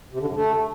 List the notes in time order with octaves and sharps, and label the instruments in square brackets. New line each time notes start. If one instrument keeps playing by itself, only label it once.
[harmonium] C3
D3
F#2
A3